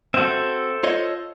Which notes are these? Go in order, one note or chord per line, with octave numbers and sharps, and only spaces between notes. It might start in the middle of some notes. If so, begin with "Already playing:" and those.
C4 F#4 A4 C5 E5
F4 C#5 D#5